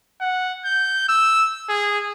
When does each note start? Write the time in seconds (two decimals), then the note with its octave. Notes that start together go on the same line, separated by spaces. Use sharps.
0.21 F#5
0.65 G6
1.09 E6
1.69 G#4